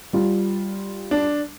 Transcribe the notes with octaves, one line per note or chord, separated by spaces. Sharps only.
G3 F4
D4